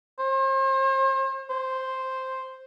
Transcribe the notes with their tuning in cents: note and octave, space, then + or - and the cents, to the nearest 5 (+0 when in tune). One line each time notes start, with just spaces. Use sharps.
C5 +40
C5 +0